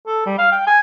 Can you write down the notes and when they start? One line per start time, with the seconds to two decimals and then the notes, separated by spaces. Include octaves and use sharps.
0.07 A4
0.26 G3
0.38 F5
0.52 G5
0.67 G#5